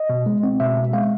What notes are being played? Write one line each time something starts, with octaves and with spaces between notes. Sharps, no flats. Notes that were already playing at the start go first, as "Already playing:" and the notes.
Already playing: D#5
B2
G#3
C4
B2 E5
B2
G#3 F5